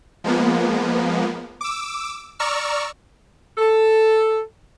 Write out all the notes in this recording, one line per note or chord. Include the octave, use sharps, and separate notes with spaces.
F3 G#3 A#3 B3
D6 E6
D5 A#5 C#6 E6 F6
A4